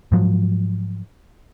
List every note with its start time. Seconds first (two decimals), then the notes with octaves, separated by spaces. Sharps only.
0.12 G#2 F3 F#3